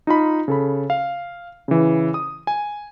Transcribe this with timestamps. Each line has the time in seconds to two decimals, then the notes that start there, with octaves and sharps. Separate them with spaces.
0.07 D#4 F4 B5
0.48 C#3 A4 B5
0.90 F5
1.68 C#3 E3
2.14 D#6
2.47 G#5